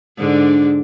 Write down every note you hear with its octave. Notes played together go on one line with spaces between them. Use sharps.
G#2 D3 D4